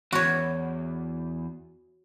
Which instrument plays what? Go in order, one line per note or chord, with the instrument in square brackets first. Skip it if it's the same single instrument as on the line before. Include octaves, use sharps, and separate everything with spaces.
[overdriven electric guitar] E2 [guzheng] F#4 C#5